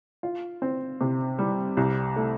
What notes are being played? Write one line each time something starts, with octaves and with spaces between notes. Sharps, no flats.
F4
C4
C3
G3
C2
A3